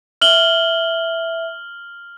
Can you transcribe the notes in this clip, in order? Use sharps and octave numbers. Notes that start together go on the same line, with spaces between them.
E5 F6 F#7 G7